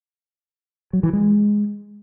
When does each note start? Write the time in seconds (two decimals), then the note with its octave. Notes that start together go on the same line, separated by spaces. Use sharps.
0.93 F#3
1.03 E3
1.13 G#3